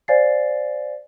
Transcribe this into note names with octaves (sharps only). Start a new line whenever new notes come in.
C5 D5 F5 G#5 A6 C7